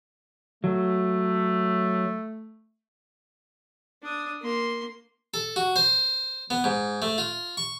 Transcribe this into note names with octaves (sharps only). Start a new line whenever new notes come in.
F#3 A3
D4 D#6
A#3 C6
A4
F#4
C5
B3
G#2
A3
F4
C#6